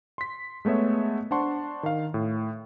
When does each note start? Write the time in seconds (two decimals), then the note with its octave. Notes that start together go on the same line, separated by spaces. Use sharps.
0.18 C6 B6
0.65 G#3 A3 B3 C#5 E5
1.31 D4 C5 F#5 A5 C6 C#6
1.83 D#3 F5
2.14 A2